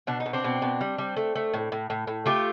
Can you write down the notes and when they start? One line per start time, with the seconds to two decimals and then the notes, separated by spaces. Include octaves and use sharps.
0.07 B2 D4
0.20 D#4
0.26 B2
0.33 C4 D4
0.44 B2
0.62 B2
0.81 G3
0.98 G3
1.17 A3
1.35 A3
1.54 A2
1.72 A2
1.90 A2
2.07 A2
2.26 A3 F4 G4